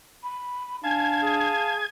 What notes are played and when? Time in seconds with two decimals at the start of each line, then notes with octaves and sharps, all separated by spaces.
0.23 B5
0.84 D4 F5 G#5 A5 G#6
1.20 G#4